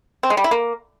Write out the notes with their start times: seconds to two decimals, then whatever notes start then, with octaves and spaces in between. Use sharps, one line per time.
0.23 C4
0.30 G#3
0.37 G3
0.44 E4
0.51 A#3